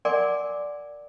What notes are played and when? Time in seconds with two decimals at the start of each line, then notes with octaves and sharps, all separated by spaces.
0.05 A#4 D5 F#5 G#5 C6 D6